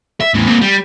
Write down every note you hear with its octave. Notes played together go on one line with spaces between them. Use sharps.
E5
E2 A2
A#3 C4
G3